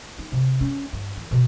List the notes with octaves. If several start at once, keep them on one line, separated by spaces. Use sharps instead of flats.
D#4
C3
C#4
G2
E3
B2